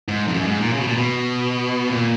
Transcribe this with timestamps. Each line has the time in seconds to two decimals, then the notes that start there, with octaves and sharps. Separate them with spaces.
0.08 G#2
0.27 F2
0.34 F#2
0.47 G#2
0.60 A#2
0.73 C#3
0.80 B2
0.87 A#2
0.95 B2
1.89 A#2